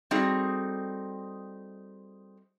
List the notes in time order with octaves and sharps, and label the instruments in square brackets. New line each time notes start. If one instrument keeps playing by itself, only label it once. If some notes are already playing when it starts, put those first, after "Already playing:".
[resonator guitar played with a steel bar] G3 C4 D#4 F#4 G#4 A4